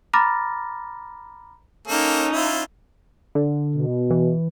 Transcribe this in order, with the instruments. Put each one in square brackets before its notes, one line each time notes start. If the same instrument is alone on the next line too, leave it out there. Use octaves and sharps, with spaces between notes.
[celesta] A#5 B5 D6 F6 A6 A#6
[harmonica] A#3 A4 [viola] C#4 D#4
[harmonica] E4 F4
[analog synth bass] D3
[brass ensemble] B2
[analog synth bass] E3